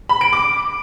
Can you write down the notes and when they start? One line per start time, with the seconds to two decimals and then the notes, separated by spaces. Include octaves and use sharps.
0.09 B5
0.21 D7
0.33 D6